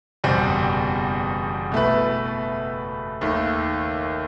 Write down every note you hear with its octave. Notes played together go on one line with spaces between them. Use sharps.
F#1 E2 B2 G3 C4
B2 A3 E4 B4
D#2 D#3 A3